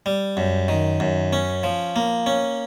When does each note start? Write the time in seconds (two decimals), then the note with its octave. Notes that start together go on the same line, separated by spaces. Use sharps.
0.06 G3
0.37 F#2
0.68 D#3
1.00 F#2
1.33 C#4
1.64 F3
1.96 A#3
2.26 C#4